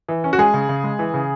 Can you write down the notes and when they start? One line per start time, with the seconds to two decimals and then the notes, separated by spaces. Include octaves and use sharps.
0.08 E3
0.24 C#4
0.33 F#4
0.38 G#3 G#4
0.54 C#3
0.69 C#3
0.84 G#3
0.99 E3
1.14 C#3